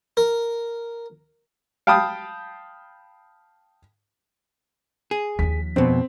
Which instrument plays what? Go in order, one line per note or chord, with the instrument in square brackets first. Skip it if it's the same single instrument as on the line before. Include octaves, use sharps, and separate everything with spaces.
[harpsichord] A#4
[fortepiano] F5 G5 A5 B5 D#6
[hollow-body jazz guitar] G#4
[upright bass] D#2 F3 [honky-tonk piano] B6
[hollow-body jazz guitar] F2 B2 [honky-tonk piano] C4